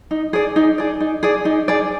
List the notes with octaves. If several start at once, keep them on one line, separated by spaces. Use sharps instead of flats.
D#4
G#4 D5
D#4
G#4 D5
D#4
G#4 D5
D#4
G#4 D5